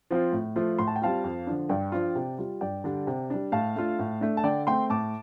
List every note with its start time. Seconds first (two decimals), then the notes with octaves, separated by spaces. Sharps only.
0.11 F3 C4 F4
0.33 A2
0.56 F3 A3 F4
0.79 A2 C6
0.87 A5
0.96 G5
1.02 G3 C4 F4 F5 A5
1.24 F2
1.47 D3 F3 D4
1.69 G2 D5 G5
1.92 F3 D4 F4
2.15 C3
2.38 G3 F4
2.61 G2 D5 G5
2.84 D3 G3 D4
3.07 C3
3.30 G3 D4
3.52 A2 F5 A5
3.76 A3 D4 F4
3.99 A2
4.21 A3 D4
4.37 A5
4.44 D3 D5 G5
4.67 A3 C4 G5 C6
4.90 A2 A5 D6